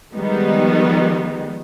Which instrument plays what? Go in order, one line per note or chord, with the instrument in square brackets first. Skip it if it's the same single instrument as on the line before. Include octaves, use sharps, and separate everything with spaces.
[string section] D#3 F3 G3 G#3 B3 D#4